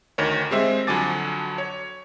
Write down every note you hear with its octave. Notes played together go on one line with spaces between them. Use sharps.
D2 D#3 A#4 C#5
G3 G#3 C4 E5
F2 D3 F#3 G#5 D6 A6
C#5